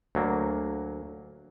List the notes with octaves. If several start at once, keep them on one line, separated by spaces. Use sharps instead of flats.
D2 F#3 A#3